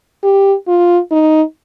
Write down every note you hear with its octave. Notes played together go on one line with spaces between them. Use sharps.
G4
F4
D#4